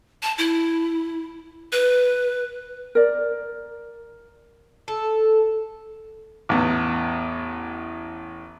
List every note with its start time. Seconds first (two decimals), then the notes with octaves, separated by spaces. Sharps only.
0.23 A5
0.38 E4
1.72 B4
2.95 A#4 D5
4.88 A4
6.49 A1 E2